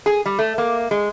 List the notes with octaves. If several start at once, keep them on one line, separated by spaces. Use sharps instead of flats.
G#4
G3
A3
A#3
G#3